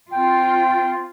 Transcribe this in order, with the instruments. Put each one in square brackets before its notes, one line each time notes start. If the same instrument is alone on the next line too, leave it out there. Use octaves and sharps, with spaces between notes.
[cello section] C4 F4 [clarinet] G5